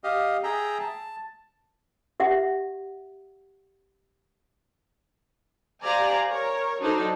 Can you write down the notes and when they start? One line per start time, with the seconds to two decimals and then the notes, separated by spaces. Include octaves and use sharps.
0.04 G4 D#5 F5
0.43 G#4 E5 G5 A#5
0.80 A5
2.20 G4 E5 F#5
5.84 G4 C5 D5 F5 G#5 A#5
6.30 A#4 C#5
6.81 F#3 D4 D#4 A4 C5